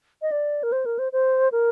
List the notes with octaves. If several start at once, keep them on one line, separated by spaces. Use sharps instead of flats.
D#5
D5
A#4
C5
A#4
C5
C5
A#4